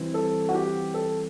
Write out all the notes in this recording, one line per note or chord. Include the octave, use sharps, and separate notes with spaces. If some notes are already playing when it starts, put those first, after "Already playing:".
Already playing: E3 G3 C4 E4
A4
F#4
G4
A4